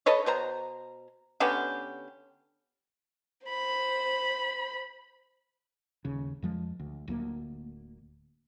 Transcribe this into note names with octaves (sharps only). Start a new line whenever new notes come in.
A4 B4 C#5 D#5
B2 C5 A#5
D3 B3 C#4 G4
C5 B5
D#1 D#2 C#3
F2 F3 G#3
D2
D1 D2 A3 A#3